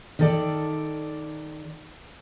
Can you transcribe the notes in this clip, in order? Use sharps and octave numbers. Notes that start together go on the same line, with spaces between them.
D#3 A4 D5